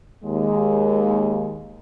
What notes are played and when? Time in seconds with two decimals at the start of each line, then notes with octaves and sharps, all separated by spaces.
0.24 D#2 G#3